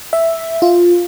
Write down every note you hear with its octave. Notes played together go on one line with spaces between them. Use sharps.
E5
F4